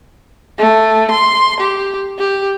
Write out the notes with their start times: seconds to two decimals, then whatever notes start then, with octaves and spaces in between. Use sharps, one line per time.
0.58 A3
1.11 C6
1.60 G4
2.18 G4